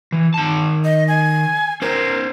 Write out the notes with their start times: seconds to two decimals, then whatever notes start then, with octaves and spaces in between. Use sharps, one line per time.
0.12 E3
0.34 D#3 A5
0.84 D#5
1.08 G#5
1.82 C#4 A#4 C5